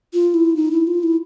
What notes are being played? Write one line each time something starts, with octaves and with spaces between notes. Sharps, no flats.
F4
E4
D#4
E4
F4
E4